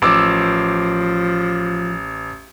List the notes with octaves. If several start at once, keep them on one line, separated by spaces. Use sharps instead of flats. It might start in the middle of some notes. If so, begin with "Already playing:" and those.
A1 F3 D6 E6